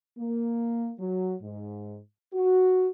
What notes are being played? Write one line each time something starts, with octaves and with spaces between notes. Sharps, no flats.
A#3
F#3
G#2
F#4